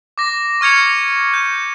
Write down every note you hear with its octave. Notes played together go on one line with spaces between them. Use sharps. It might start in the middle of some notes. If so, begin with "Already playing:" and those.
D6 A#6
C#6 F6 G#6 C#7 F7
G6